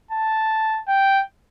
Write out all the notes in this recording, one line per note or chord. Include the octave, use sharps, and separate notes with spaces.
A5
G5